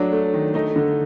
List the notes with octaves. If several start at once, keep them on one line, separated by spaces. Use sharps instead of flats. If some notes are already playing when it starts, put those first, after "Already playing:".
Already playing: F#3 A3 D4
A3
D#3
A3 D#4
D3